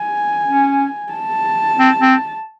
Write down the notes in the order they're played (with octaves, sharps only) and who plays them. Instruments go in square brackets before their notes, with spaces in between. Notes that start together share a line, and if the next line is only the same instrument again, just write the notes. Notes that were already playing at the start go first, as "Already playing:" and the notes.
Already playing: [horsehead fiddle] G#5
[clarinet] C#4
[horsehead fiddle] A5
[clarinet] C4
C4